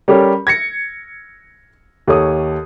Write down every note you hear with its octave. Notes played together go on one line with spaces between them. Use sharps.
G3 C#4 G4 A4 A#4 C#5
G#6 A#6 C#7
D#2 A4 C#5 D#6